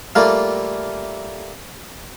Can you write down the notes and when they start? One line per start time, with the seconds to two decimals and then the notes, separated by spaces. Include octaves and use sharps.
0.15 G3 A3 A#3 F4